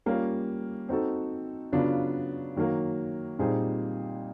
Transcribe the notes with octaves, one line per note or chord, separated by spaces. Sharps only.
G3 A#3 C#4 F4
C4 D#4 F#4 A4
C#3 F#3 B3 D4 F4
D#3 F#3 A#3
A#2 G3 C4 D#4 G#4